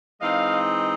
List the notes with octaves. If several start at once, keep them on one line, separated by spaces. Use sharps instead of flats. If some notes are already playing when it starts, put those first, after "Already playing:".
E3 G#3 C4 D#4 D#5 F5